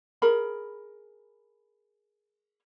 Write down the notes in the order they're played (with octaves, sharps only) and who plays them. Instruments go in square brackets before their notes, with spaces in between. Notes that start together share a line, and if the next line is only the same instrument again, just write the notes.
[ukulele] G#4 A#4 B5